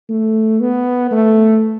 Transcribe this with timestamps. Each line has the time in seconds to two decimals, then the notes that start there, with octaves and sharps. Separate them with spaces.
0.09 A3
0.60 B3
1.11 A3